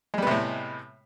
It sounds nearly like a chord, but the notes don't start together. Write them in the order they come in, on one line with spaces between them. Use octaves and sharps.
G#3 G3 B3 C3 A2